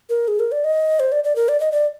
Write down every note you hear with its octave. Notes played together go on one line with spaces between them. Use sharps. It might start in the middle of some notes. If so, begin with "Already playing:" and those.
A#4
G#4
A#4
D5
D#5
C5
D5
D5
A#4
D5
D#5
D5